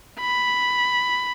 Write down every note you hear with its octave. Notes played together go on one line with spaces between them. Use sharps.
B5